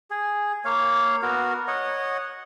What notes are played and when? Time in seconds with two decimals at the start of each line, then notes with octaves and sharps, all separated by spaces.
0.11 G#4
0.65 A#3 C#5 F5
1.22 B3 F#4 A#4
1.68 C#5 D#5 F#5